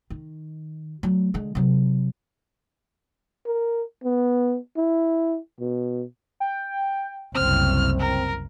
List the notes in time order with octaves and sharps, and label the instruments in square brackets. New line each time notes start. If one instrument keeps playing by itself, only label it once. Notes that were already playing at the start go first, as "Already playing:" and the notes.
[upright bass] D#3
F#3 A3
D3 G#3
C3 F#3
[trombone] A#4
B3
E4
B2
[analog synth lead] G5
[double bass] F#1 C2 [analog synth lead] C4 [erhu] F6
[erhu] A#4